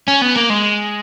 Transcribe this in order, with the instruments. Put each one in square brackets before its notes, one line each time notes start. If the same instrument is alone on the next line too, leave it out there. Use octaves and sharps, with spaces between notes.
[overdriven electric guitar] C#4
B3
A#3
G#3